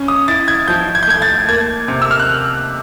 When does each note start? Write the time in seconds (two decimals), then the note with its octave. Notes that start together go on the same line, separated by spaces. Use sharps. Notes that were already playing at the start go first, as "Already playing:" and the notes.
Already playing: C#4
0.08 D#6
0.28 E4 A6
0.48 G#6
0.68 F3 G6
0.95 G#6
1.03 G6
1.07 A3 G#6
1.22 A6
1.48 A#3 G#6
1.88 C3
2.02 E6
2.11 F6
2.20 F#6